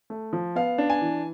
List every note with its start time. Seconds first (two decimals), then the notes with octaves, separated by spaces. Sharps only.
0.10 A3
0.33 F3
0.55 B3 F5
0.78 D4
0.90 G#5
1.01 E3